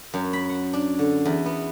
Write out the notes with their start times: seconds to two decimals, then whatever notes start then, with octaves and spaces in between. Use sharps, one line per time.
0.14 F#2
0.33 B5
0.49 F#5
0.73 D4
0.99 D3
1.25 E2
1.46 B3